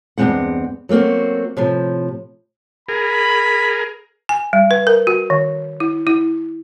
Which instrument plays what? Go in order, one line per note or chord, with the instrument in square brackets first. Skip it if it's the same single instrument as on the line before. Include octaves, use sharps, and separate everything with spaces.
[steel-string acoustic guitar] E2 G2 D#3 G#3 C4 F#5
F#3 A3 A#3 C4 F#4
A2 C3 F3
[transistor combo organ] G#4 A#4 [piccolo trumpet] B5
[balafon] G#5
G3
B4
A#4
F#4
D#3
E4
E4